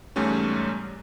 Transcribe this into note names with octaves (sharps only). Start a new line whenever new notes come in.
E2 G#2 G3 A3 C#4